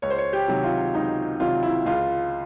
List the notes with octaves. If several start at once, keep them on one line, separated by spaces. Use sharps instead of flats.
C#2 C#5
C5
C#5
G4
C3 D#3 F#3
F4
C#2 D#4
C3 D#3 F#3 F4
E4
C#2 F4